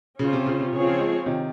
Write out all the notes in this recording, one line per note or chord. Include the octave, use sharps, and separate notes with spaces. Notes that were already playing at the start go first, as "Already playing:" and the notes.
C#3 C#4 F4 C5
C3
C#3
C3
C#3 C4 F4 G#4 C#5
C#3 F3
F3 G#3
C3 D#3